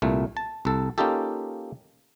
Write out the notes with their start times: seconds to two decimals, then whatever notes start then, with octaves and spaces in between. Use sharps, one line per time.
0.02 C2 A#2 A3
0.37 A5
0.65 C2 A4
0.98 A#3 C#4 D#4 F4 G4 A4